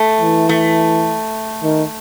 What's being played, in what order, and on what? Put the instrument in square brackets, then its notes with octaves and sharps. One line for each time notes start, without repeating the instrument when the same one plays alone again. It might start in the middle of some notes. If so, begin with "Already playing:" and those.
Already playing: [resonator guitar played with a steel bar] A3
[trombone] E3
[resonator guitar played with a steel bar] A3
[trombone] D#3